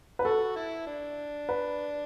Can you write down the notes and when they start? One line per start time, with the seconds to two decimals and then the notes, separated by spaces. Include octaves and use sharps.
0.19 B4
0.25 F#4 A4
0.56 E4
0.87 D4
1.49 B4